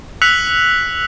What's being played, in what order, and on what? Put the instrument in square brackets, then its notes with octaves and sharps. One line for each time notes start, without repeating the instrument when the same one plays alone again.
[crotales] E6 F#6 B6 C#7 F7 F#7